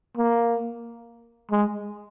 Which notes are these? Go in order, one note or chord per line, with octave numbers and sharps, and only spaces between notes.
A#3
G#3